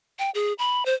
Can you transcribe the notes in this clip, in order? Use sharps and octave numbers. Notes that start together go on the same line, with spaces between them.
G5
G#4
B5
C5